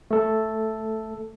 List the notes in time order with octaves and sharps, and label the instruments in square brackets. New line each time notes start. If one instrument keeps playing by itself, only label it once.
[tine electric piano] A3 A4